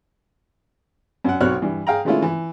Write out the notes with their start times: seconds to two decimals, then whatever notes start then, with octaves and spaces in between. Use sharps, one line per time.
1.24 F#2 F#5
1.41 B1 C4 F#4 C#5 F6 F#6
1.62 G2 E3
1.87 G#4 F5 G5 A#5
2.05 D#3 G#3 A3 C#4 E4 F4
2.22 E3